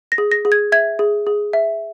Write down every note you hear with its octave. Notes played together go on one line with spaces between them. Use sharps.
A#6
G#4
A#6
G#4
G#6
E5 G#6
G#4
G#4
E5